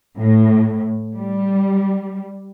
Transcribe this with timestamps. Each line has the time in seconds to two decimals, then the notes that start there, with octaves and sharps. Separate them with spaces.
0.17 A2
1.17 G3